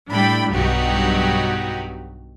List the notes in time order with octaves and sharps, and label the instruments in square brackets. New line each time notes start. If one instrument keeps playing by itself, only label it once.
[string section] A2 G3 D4 E4 G5 B5
B1 G2 F#3 D#4 F#4 G4